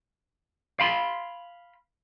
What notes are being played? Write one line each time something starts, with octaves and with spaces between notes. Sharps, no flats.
F5 B5 C6